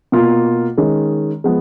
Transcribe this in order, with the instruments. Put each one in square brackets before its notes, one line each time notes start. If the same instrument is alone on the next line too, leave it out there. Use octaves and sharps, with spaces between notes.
[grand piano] B2 A#3 F4
D#3 G#3 C#4
F3 G#3 B3